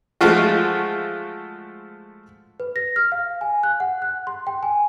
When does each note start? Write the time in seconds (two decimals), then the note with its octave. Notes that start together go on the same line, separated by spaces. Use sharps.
0.21 F3 G#3 A3 F4 F#4
2.60 B4
2.76 A#6
2.96 F6
3.12 F5
3.41 G#5
3.63 F#6
3.80 F#5
4.02 F#6
4.27 C6
4.47 G5
4.63 G#5